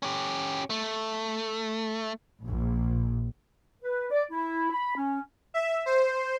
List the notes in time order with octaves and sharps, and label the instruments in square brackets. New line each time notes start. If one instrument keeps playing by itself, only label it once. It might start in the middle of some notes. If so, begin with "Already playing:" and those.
[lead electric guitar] C#4 G4
A3
[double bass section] A#1
[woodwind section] B4
D5
E4
B5
C#4
[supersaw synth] E5
C5